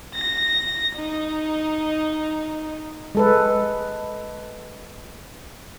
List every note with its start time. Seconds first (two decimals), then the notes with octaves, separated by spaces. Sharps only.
0.14 A#6
0.95 D#4
3.15 G#3 A4 B4